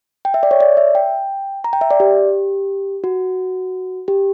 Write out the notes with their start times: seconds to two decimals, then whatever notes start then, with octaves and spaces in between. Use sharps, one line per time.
0.25 G5
0.34 E5
0.43 D5
0.51 C#5
0.60 D5
0.77 E5
0.95 G5
1.64 A#5
1.73 G5
1.81 E5
1.91 D5
2.00 G4
3.04 F#4
4.08 G4